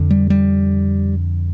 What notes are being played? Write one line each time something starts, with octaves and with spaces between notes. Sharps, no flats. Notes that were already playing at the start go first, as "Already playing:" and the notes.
Already playing: F2 D3
G3
G3